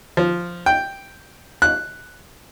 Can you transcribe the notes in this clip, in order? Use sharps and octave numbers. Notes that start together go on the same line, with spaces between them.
F3
G5
F#6